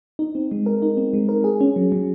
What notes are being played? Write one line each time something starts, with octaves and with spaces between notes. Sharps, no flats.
D#4
C4
G#3
A#4
D#4
C4
G#3
A#4
G#4
C#4
F#3
F#3